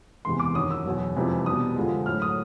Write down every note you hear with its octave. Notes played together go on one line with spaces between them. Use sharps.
E2 C3 E3 G#3 C6
D6
F#2 D#3 F#3 D#6
E6
E2 B2 F#3
F2 C3 E3 G#3
B2 G3 D#6
F2 D3 F3 G#3
A2 F#3 F6
D#6